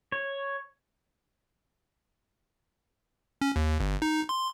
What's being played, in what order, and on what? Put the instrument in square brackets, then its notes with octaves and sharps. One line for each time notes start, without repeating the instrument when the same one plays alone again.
[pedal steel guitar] C#5
[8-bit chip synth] C#4
D#2
G1
D#4
C6